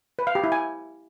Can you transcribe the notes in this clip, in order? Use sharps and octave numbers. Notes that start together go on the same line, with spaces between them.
B4
F5
G4
E4
G#5